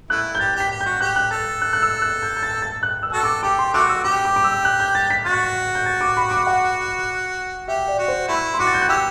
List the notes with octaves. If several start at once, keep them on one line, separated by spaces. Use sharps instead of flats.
A3 E4 F#6
G6
G4 A6
G4 B6
G4
G6
F#4
G4 F#6
F#6
A4 A6
F#6
F#6
E6
F#6
G6
G6
A6
A6
F#6
E6
F#4 A4 E6
D6
G4 D6
C6
A3 F#4 D6
E6
G4 D6
D6
D6
E6
F#6
G6
A6
B6
F#4 A6
G6
A6
D6
B5
D6
F#5
G4 E5
D5
F#4
C5
A3 E4 B5
C6
F#4 D6
A6
G6
F#6
E4 G4 E6